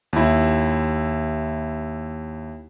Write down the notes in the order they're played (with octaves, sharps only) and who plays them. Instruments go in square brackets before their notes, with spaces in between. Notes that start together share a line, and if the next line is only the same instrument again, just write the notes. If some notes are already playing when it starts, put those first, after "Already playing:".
[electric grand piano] D#2 E4